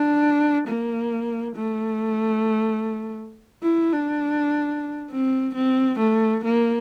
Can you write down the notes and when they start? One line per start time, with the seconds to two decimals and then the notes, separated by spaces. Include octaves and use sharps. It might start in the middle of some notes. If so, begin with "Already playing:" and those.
Already playing: D4
0.68 A#3
1.56 A3
3.62 E4
3.92 D4
5.11 C4
5.55 C4
5.99 A3
6.44 A#3